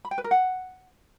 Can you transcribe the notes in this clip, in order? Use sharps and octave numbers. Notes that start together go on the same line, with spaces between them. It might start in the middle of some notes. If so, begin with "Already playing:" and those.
B5
G5
B4
A#4
F#5